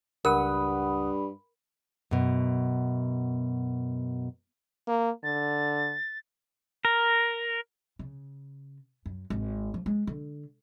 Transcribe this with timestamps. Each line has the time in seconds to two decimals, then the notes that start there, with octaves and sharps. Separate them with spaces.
0.25 C#2 G2 A#4 F#5 B5 D#6
2.11 F#2 B2
4.88 A#3
5.24 D3 A6
6.85 A#4
7.99 C#3
9.06 F#2
9.30 G#1
9.74 F3
9.86 G#3
10.07 D3